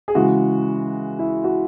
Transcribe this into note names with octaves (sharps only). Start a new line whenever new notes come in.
G#4
C#3 E3 G#3 F#4
E4
F#4